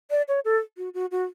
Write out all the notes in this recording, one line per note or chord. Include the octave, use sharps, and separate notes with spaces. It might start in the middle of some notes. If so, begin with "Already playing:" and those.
D5
C#5
A4
F#4
F#4
F#4